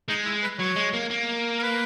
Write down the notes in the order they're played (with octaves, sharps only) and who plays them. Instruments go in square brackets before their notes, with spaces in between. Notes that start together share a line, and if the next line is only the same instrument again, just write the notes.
[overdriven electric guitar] G#3 [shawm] D#4
[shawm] E4
B4
[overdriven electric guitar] F#3 [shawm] C#5
[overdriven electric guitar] G#3
A#3
A#3
[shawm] A#4
B4